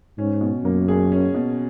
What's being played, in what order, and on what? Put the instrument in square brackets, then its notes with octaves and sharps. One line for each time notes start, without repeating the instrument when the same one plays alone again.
[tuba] G#2 [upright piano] C#4
[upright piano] B2
[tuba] F#2 [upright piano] A#3
[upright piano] G#4
C#4
B2